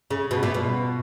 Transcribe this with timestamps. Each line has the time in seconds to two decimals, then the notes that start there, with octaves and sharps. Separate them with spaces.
0.11 C#3
0.31 B2
0.43 A#2
0.54 B2